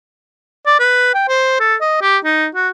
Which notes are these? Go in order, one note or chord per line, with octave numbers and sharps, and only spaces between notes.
D5
B4
G5
C5
A4
D#5
G4
D#4
F#4